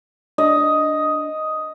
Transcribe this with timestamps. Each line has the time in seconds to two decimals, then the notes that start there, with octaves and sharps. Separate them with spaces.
0.38 D4 D#5